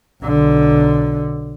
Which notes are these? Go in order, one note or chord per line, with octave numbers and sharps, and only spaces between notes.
B1 D3